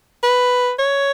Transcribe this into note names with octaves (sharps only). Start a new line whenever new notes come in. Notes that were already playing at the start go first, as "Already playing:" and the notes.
B4
C#5